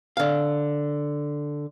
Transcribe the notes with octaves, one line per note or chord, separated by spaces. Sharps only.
D3 F5